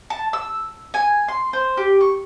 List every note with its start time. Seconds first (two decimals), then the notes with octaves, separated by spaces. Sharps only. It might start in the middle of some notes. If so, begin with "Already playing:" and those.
0.10 A5
0.33 E6
0.94 G#5
1.28 C6
1.53 C5
1.77 G4
2.01 C#6